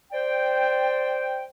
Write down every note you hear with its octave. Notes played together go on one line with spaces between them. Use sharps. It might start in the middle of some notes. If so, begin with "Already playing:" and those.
C5 D5 G5